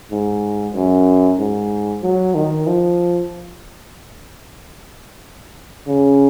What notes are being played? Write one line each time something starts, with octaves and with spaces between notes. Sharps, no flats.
G#2
F#2
G#2
F#3
D#3
F3
C#3